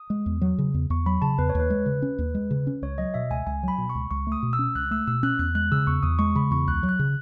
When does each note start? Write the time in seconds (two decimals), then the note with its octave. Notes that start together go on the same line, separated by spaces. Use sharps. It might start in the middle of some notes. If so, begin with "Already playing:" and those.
Already playing: D#6
0.10 G#3
0.26 E2
0.41 F#3
0.58 C#3
0.74 E2
0.90 E2 C#6
1.06 F#3 B5
1.22 C#3 A5
1.38 E2 B4
1.49 C#5
1.55 D#2 B4
1.70 G#3
1.86 C#3
2.02 C#4
2.18 D#2
2.35 G#3
2.51 C#3
2.67 C#4
2.82 C#2 C#5
2.98 F#3 D#5
3.14 B2 E5
3.30 C#2 G#5
3.46 C#2 G#5
3.63 F#3 B5
3.78 B2
3.90 C#6
3.95 C#2
4.11 C#2 C#6
4.27 A3
4.32 D#6
4.43 B2
4.53 E6
4.59 C#4
4.75 C#2 F#6
4.91 A3 E6
5.07 B2 E6
5.23 C#4 F#6
5.39 E2 F#6
5.55 G#3 F#6
5.72 C#3 E6
5.87 E2 C#6
6.03 E2 D#6
6.19 G#3 C#6
6.35 C#3 B5
6.51 E2 C#6
6.67 C#2 F#6
6.83 F#3
6.89 F#6
6.99 C#3